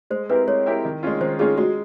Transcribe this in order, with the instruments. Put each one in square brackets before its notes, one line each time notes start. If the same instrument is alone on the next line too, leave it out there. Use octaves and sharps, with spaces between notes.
[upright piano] G#3 [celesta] C5
[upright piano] C4 E4 G4 A#4 [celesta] B4
[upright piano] G#3 [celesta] C#5
[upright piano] C4 E4 G4 A#4
D#3
G#3 C#4 F4
[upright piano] D#3 [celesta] C5
[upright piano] G#3 C#4 F4 [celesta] G#4
[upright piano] G#3 [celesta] F#4